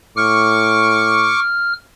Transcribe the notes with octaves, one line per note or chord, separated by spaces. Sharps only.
A2 C#6 D6 F6